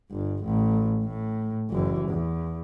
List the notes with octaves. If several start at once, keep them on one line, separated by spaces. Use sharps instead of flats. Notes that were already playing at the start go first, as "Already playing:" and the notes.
G1
A1
A2
F#1 E3
E2